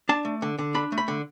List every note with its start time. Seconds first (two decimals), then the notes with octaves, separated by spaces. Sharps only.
0.09 D4 A5
0.25 A3
0.42 D3
0.59 D3
0.74 D4 B5
0.92 A3
0.98 B5
1.08 D3